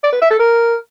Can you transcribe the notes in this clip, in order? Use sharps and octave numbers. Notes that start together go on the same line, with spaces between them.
D5
B4
E5
A4
A#4